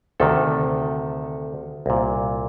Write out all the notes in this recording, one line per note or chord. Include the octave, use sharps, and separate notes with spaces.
D2 C3 D#3 A4
C2 A#2